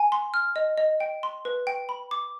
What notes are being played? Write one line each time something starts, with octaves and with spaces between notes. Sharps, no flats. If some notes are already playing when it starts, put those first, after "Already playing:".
Already playing: G#5
C6
F6
D#5
D#5
G5
C6
B4
G5
B5
D6